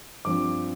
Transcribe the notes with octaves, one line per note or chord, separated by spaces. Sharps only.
G2 F3 C4 D6